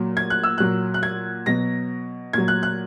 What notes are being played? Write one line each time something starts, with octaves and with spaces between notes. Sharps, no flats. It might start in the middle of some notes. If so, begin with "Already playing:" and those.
Already playing: A#2 F#3
G#6
F#6
E6
A#2 F#3 F#6
F#6
G#6
B2 F#3 A#6
A#2 F#3 G#6
F#6
F#6